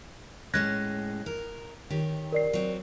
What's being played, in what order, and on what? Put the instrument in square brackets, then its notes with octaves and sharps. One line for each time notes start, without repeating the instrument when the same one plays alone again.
[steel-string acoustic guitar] A2 G#3 C#4 [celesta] F#6 G#6 A#6
[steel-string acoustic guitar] A#4
D#3 G4 C#5
[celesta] A#4 D5 C7
[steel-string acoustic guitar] F#3 C4